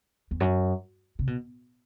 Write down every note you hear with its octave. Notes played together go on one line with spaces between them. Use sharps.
E2
F#2
C3
B2